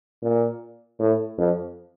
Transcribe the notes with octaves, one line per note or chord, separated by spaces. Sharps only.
A#2
A2
F2